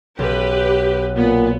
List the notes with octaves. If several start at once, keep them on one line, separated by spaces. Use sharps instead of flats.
B1 G4 B4
A#2 B3